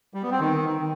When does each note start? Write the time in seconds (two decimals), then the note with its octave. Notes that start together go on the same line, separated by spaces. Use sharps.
0.14 G3
0.23 B3
0.31 C4
0.40 D#3